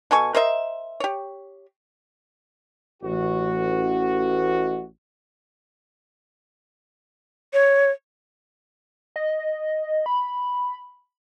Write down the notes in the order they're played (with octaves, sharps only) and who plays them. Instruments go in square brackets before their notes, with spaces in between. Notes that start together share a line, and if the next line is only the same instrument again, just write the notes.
[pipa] B2 A4 G#5 C#6
A#4 C5 D#5 E5
G4 C#5
[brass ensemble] A1 F#4
[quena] C#5
[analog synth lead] D#5
B5